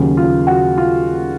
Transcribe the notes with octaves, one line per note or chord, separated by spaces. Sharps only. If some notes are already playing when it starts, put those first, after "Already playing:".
Already playing: D#2 C#3 F#3
F4
F#4
F4